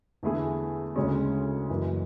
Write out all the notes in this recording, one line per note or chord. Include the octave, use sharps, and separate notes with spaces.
E2 D3 A3 E4 G#4
D2 C#3 G#3 C#4
F#1 F#2 E3